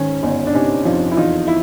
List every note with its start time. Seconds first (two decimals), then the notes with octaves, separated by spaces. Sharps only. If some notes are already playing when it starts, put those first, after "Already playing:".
Already playing: G#2 D#3 C#4
0.23 G1 C#4 D#4
0.47 D4
0.54 C3 C#4 D#4
0.85 F2 D#4 F4
1.11 E4
1.16 E2 D#4 F4
1.47 E4